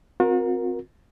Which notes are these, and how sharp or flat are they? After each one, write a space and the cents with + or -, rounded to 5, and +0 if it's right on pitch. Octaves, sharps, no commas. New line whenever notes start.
C4 +0 F#4 -45 A#4 +10